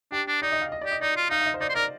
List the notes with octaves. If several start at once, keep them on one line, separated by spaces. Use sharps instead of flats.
D4 G4
D4
D#4 D5
D#5
F5
D#5
D5
G4
D#5
D#4 D5
F4
D#4 F5
F5
D#5
C5
D#4 D5
C5
A#4 D5